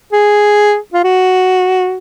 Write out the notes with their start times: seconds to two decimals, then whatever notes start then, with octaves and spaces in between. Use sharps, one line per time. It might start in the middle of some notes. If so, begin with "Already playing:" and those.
0.13 G#4
0.94 F4
1.04 F#4